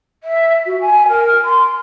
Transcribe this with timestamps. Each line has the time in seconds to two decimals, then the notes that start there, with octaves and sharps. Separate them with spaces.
0.23 E5
0.66 F#4
0.81 G#5
1.08 A#4
1.44 C6